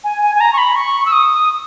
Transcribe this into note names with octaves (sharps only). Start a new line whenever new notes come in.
G#5
G#5
G#5
A#5
C#6
B5
C#6
E6
D#6